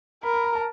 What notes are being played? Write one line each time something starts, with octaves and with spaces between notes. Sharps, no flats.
A#4 B5
B5
A#5
A5